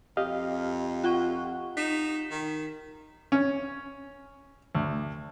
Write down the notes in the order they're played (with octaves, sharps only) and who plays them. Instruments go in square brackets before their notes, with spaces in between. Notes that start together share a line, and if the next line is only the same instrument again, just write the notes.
[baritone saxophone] F2 [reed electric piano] G4 D#5 F5
[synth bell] F4 F#5 C#6
[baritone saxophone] D#4 [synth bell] B6 E7
[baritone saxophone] D#3
[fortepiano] C#4
D2